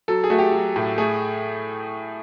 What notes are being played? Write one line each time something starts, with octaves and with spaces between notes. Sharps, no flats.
F#3 A4
G#4
A3 F#4
G4
F#3
A2
A3 G#4